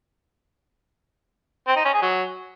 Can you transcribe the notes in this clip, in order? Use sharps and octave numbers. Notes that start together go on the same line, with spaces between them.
C4
D#4
C#4
G#4
F#3